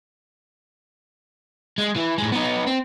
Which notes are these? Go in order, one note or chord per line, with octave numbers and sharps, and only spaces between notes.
G#3
E3
A2 G#3
B3 D#4
C4